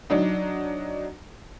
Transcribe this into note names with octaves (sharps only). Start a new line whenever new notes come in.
F#3 D4 D#4